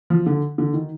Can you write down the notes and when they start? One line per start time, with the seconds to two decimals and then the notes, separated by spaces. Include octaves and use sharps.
0.10 F3
0.26 D3
0.58 D3
0.74 D#3